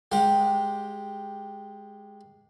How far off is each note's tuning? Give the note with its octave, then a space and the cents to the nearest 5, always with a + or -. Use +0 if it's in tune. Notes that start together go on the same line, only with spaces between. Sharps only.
G#3 +0 G4 +0 F#5 -45